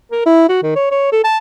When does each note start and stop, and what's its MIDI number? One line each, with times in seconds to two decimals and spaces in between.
0.11 0.24 70
0.26 0.49 64
0.49 0.61 66
0.63 0.73 51
0.76 0.89 73
0.91 1.07 73
1.12 1.23 69
1.24 1.38 81